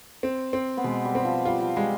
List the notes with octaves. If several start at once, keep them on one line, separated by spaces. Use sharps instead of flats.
C4
C4
B3
B2 G#3
G3
C4
F3
G3 F4
F3
G3 G#3